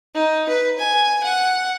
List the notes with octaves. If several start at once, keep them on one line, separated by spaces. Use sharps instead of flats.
D#4
B4
G#5
F#5